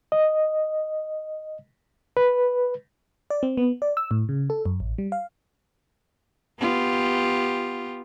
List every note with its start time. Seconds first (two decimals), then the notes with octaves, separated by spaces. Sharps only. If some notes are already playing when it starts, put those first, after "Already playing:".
0.12 D#5
2.17 B4
3.30 D5
3.43 C4
3.57 B3
3.82 D5
3.97 E6
4.11 A2
4.29 C#3
4.50 A4
4.66 F#2
4.80 A1
4.98 G3
5.12 F5
6.59 B3 F4 G4